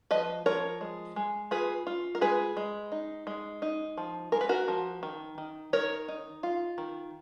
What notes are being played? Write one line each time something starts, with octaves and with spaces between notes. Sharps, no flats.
F3 B4 D#5
F3 A#4 C#5
G#3
G#3
F4 G#4 B4
F4
A#4
G#3 G#4 B4
G#3
D#4
G#3
D#4
F3
G#3 A#4
B4
F#4 A#4
F3
D#3
D#3
D#3 A#4 C#5
D#4
F4
D#3